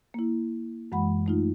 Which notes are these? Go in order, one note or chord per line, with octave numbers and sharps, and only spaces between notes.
A#3 E4
F#2 E3 G#3 F#5 B5
A3 D#4 F4